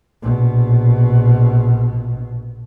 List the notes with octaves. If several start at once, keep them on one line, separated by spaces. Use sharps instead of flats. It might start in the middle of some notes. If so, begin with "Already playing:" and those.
A#1 B2